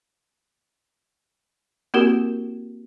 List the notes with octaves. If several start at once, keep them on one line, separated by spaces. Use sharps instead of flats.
A#3 C4 E4 F#4 G4 A#4